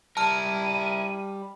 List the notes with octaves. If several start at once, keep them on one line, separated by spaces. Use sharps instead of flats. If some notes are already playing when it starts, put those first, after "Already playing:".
G3 E4 A#4 A5 F6 D#7